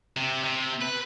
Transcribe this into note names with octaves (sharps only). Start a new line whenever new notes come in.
C3
C3
B4